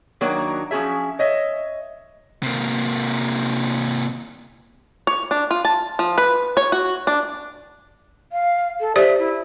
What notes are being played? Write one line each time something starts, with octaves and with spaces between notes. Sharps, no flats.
D#3 F#3 A#3 D4 F#4 A#4
F3 C#4 F#4 G#4 E5
C#5 D#5 E5
C3 A#3
C#5
D4
F4
A5
F3
B4
C#5
F#4
D4
F5
A4
G4 C5 D5 E5
E4